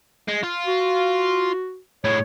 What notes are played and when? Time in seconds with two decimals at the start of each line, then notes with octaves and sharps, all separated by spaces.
0.28 G#3
0.43 F4
0.66 F#4
2.04 A2 G#3 C#5